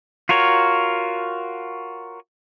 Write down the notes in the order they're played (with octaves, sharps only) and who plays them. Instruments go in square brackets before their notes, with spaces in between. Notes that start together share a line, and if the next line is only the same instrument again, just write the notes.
[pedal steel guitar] F4 F#4 A#4 C#5